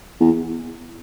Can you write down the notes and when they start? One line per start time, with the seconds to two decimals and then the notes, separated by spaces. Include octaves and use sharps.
0.20 E2